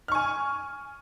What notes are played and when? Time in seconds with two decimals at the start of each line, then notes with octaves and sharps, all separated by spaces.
0.08 F6
0.12 C#6
0.15 G#5